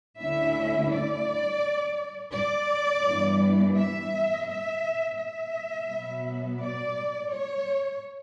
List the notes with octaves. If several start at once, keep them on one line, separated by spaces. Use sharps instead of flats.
D2 D3 A3 C#4 E4 E5
D5
D5
G2 E3 G3 B3
E5
E5
E5
B2 F#3 B3
D5
C#5